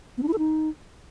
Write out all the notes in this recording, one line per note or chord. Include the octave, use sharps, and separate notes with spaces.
B3
D4
E4
A4
D#4